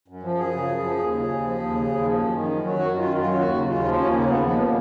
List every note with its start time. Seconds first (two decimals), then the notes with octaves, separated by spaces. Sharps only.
0.08 F#2
0.23 F3
0.38 F#2 G#4
0.53 C#3
0.68 F#2
0.83 F3
0.98 D#2
1.13 C#3
1.28 D#2
1.43 F3
1.58 D#2
1.73 C#3
1.88 D#2
2.03 F3
2.18 F#2
2.33 D#3
2.49 F#2
2.63 F#3
2.78 F#2 F#4
2.93 D#3
2.99 F4
3.08 F#2
3.19 F4
3.24 F#3
3.38 D#2 F#4
3.53 C#3
3.69 D#2 F4
3.84 F3
3.99 D#2 C#4
4.13 C#3 A#3
4.28 D#2 B3
4.43 F3 B3
4.53 G#3
4.58 A#2 A#3